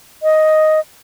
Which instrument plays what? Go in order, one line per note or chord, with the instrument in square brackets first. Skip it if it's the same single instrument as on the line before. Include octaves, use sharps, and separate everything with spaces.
[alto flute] D#5